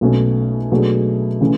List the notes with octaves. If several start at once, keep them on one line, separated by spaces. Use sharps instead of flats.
B1 B2 A3 C#4
B2 F#3 A3 D4 G#4
C#3 E3 A3